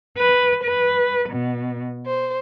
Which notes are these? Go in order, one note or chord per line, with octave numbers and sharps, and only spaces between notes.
B4
B4
B2
C5